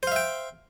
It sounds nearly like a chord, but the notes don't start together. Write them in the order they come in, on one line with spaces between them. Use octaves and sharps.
C5 F5 E5 G5